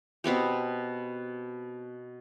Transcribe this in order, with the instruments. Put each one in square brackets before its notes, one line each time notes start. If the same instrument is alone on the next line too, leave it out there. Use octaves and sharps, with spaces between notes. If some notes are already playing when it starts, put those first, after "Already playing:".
[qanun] B2 B3 C4 G4